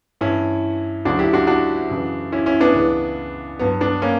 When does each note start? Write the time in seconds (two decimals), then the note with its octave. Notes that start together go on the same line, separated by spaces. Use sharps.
0.21 G2 E3 C#4 E4
1.05 D2 C#3 F#3 D4 F#4
1.19 E4 G4
1.33 D4 F#4
1.47 D4 F#4
1.90 F#2 C#3 E3
2.32 C#4 E4
2.46 C#4 E4
2.61 B3 D4
2.74 C#2 C#3 E3
3.59 G2 F#3 B3
3.81 B3 D4
4.02 A#3 C#4